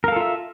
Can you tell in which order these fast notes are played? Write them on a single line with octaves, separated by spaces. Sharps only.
A#4 F5 A4 F4 E5